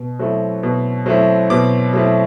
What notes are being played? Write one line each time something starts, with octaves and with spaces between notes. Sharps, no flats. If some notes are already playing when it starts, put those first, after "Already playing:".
Already playing: B2
F#3 A3 C4 E4
B2
F#3 A3 C4 E4
B2 D6
F#3 A3 C4 E4